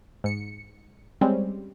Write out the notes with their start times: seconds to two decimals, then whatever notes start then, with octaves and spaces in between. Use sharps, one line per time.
0.24 G#2 C#7
1.21 G3 G#3 C4 C#4